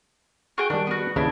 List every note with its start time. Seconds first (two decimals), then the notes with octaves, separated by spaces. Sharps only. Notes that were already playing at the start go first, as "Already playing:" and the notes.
0.58 F#4 G#4 G5
0.70 D#3 G3 D4
0.87 B3 F#4
1.16 D#2 C#3 E3 D4 E4